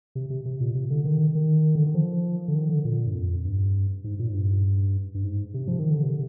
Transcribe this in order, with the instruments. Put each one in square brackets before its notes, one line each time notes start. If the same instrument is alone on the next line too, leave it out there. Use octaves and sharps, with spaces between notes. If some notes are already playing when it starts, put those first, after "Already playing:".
[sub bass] C3
C3
C3
A#2
C3
D3
D#3
D#3
D3
D#3
F3
D3
D#3
D3
A#2
G2
F2
G2
G#2
A#2
G#2
G2
G2
G#2
C3
F3
D#3
D3
C3